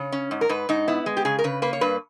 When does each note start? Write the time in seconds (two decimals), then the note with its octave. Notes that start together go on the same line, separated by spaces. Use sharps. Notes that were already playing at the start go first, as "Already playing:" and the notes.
Already playing: C#3 C#5
0.12 C#4
0.31 G#2
0.41 A#4
0.49 G#2 B4
0.69 G#2 D#4
0.88 B3 E4
1.06 G#3
1.17 G4
1.25 C#3 G#4
1.39 A#4
1.44 C#3 B4
1.62 A#3 B4
1.73 C#5
1.81 G2 B4